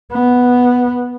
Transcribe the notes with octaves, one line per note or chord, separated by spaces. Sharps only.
B3